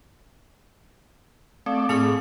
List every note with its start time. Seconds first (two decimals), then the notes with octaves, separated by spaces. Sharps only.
1.66 A3 C4 D5
1.89 A2 C4 G#4 D6 C#7